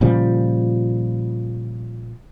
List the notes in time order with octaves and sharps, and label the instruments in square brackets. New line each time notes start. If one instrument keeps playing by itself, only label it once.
[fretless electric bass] A#2 C#3 F3 G3